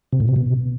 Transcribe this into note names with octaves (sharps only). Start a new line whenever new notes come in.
C3
A2
C3
B2